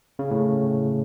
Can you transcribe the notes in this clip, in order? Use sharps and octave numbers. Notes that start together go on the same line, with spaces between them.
C#3
A2